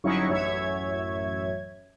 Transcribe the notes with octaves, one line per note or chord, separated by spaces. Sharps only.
G1 F#3 C#4 D#4 E4 C#6
A1 F#2 C#5 E5 G#6